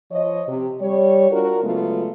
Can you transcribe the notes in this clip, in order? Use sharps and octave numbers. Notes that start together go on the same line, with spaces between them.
F3 C#5 D#5
C3
G3 C#5
D4 F4 F#4 A#4
C#3 F#3 G#3 A3 B3 F4